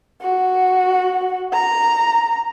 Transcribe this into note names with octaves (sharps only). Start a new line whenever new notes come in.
F#4
A#5